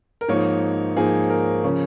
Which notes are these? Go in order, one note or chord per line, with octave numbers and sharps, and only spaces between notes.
A#4
G#2 F3 A#3 D#4 C#5
G#2 F3 A#3 D#4 G#4
A#4
C#3 F3 C#4